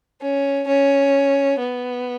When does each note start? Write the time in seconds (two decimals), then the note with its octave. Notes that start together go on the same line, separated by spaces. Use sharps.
0.21 C#4
0.67 C#4
1.59 B3